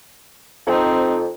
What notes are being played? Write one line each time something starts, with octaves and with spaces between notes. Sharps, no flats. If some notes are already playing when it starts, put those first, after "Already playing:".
F2 C4 D#4